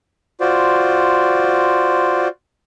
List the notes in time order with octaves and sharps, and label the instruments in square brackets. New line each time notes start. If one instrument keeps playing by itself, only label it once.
[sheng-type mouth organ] F4 F#4 C5 D5